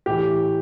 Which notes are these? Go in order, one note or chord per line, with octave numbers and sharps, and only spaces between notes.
A2 E3 G4